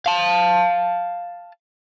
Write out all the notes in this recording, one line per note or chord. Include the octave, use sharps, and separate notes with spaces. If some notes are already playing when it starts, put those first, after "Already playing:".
F5 A5